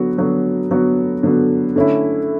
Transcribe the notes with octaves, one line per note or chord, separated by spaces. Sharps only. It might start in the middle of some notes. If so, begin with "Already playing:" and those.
Already playing: D3 F#3 B3 F#4
D3 F#3 B3 F#4
D3 F#3 B3 F#4
D3 F#3 B3 F#4
D3 A3 C#4 E4